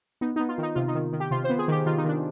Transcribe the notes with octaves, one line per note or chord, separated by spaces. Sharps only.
B3 D#4
B3 D#4
F4
D#3 D#4
C3 F4
D#4
D#3
D#3
G4
C3 F4
C5
B3
G#4
D#3 G4
D#3 F4
D#4
D#3 D4